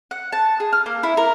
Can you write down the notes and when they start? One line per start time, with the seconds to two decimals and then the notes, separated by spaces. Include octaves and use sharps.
0.11 F#5
0.32 A5
0.60 G#4
0.73 F6
0.86 A#3
1.03 E4
1.17 A#4